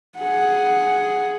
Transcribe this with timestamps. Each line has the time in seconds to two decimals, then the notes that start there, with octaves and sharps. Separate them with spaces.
0.18 G#4 F#5